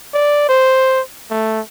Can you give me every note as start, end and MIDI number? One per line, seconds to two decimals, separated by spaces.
0.14 0.45 74
0.49 1.01 72
1.30 1.60 57